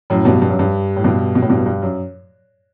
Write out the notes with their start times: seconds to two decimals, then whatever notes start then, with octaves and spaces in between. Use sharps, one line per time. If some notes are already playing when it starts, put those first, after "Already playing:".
0.10 F#2 A2
0.25 G2 B2
0.42 G2
0.50 F#2
0.59 G2
0.96 A2
1.04 G2 B2
1.35 B2
1.42 A2
1.50 G2 B2
1.66 G2
1.82 F#2